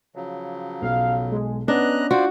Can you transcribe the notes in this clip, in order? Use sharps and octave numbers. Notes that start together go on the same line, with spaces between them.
C#3 F3 F#3
B1 F5
G#3
B3 C#4 D4 D#5 A#5 F#6
F4 F#4 C5 D5